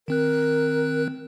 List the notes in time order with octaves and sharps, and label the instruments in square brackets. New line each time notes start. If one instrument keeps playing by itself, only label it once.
[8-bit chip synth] D#3 C4 F#6 [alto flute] A#4